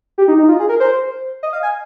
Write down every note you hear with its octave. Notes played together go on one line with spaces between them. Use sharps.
G4
D#4
D#4
F4
G#4
A#4
C5
D#5
F5
G#5